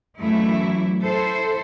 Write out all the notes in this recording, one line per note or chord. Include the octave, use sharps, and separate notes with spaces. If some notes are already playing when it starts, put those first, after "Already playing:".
F#2 E3 F#3 A3 E4
E4 A4 C5